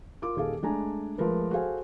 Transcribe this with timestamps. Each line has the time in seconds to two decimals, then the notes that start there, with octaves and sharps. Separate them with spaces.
0.22 F4 A#4 D6
0.36 D#1 D#3 G#4 A4 F5
0.63 G#3 A3 D4 G#5 A#5
1.18 F3 G#3 A3 A#4 B4
1.51 F#4 G#4 A4 C5 F5 G#5